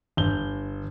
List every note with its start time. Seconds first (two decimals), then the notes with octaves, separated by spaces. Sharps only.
0.17 G1 G6 G7